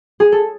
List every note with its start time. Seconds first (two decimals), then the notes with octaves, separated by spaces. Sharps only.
0.20 G#4
0.32 A4